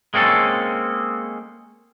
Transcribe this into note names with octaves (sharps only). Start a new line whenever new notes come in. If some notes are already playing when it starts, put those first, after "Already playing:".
G#3 A#3 C4 C#4 A4